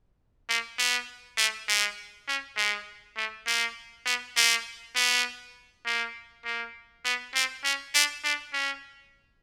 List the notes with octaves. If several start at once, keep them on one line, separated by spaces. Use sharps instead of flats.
A#3
B3
A3
G#3
C#4
G#3
A3
A#3
B3
A#3
B3
A#3
A#3
B3
C4
C#4
D4
D4
C#4